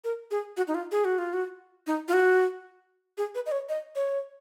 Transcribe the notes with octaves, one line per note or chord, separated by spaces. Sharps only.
A#4
G#4
F#4
D#4
F4
G#4
F#4
F4
F#4
D#4
F4
F#4
G#4
B4
D#5
C#5
D#5
C#5